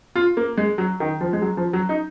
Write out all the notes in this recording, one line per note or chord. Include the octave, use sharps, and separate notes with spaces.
F4
A#3
G#3
F#3
D#3
F3
G#3
F#3
F3
F#3
D#4